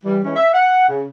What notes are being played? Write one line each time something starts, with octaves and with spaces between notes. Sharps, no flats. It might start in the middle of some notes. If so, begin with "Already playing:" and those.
E3 G3
E3 G#3 C#4
E5
F#5
C#3